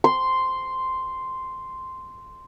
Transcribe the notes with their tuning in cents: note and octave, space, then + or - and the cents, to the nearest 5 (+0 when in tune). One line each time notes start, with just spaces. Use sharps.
C6 -5